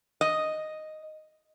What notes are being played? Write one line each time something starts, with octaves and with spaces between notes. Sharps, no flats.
D#5